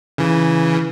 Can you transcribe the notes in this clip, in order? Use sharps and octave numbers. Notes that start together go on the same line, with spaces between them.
C#3 E3